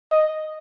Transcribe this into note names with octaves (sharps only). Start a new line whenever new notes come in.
D#5